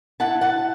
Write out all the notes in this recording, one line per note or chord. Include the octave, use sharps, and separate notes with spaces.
E4 F#5 A5
F#5 A5